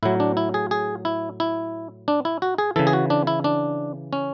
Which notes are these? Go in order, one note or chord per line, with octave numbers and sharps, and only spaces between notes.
A2 F#3 E4
D4
E4
G#4
G#4
E4
E4
D4
E4
F#4
G#4
C#3 E3 A4
G#4
F#4
D4
E4
D4
C#4